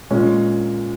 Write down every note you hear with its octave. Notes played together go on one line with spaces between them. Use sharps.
A#2 G#3 C#4